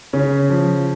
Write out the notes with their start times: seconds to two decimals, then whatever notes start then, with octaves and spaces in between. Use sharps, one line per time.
0.13 C#3 C#4
0.50 F3